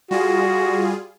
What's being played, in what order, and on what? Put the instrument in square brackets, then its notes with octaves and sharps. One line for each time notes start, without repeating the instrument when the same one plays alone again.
[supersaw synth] G3 F4 G#4 [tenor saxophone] F#4